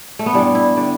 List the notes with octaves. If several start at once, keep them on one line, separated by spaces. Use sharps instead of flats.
A3
B3
G2 E3 G3 D4
E4
D3 G3